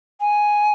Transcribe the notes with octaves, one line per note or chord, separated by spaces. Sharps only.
G#5